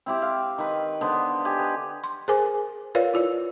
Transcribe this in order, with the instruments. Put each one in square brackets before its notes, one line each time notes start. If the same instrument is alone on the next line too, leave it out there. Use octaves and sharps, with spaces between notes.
[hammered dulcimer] C4 E4 G4
F5
D#3 B4
D3 B3 C5
G4 G#5
B4
[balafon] C6
G#4 A#4 C5 G#5 D6
F4 A#4 B4 C#5 D5 F5
E4 F4 D5